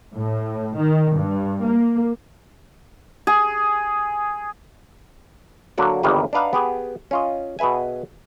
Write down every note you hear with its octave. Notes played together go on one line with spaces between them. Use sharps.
A2
D#3
G2
A#3
G#4
D3 F#3 A#3 F#4 D5
G1 E2 D#3 G3 A#3 B4
D4 D#4 B4 F5 F#5 A#5
B3 G4 G#4
C#4 F4 D#5
B2 G#4 B4 E5 G#5